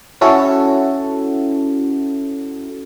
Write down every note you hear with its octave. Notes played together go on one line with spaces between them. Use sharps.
C#4 E4 F#4 A4